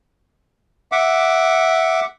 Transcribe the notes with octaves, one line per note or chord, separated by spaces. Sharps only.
E5 F#5 D6